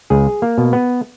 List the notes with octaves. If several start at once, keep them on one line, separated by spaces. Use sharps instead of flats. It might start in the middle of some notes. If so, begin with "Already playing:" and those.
C#2 G#4
A#3
B2
B3